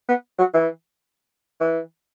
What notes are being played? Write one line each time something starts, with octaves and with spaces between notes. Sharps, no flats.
B3
F#3
E3
E3